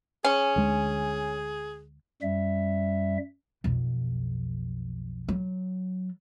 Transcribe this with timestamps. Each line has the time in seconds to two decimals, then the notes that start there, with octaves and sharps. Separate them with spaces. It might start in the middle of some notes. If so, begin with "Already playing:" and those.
0.24 C#4 G#4
0.56 D2 D3 G#3
2.22 F#2 G3 E5
3.64 B1 F2
5.28 F#3